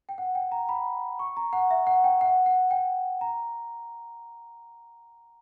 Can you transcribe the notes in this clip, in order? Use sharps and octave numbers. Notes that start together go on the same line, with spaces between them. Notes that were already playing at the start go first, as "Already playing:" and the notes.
G5
F#5
G5
A#5
B5
C#6
A#5
F#5
E5
F#5
G5
F#5
F#5
G5
A#5